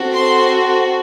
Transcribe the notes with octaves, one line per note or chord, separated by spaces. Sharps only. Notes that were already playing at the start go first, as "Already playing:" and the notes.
Already playing: C4 F#4 A4
C5 C6